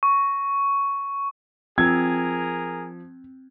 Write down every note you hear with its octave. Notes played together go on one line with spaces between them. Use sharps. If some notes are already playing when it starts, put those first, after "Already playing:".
C#6
F3 C4 G#4 A#4 G#6